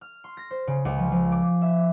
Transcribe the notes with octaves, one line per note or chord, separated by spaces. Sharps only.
F6
C6
A#6
C5
C#3
C#2
F3
F3
D6
E5